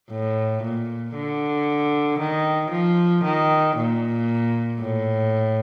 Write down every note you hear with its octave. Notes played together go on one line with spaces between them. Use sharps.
A2
A#2
D3
D#3
F3
D#3
A#2
A2